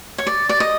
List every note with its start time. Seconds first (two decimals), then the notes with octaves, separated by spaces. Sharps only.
0.18 C#5
0.27 D5
0.49 D5
0.60 D#5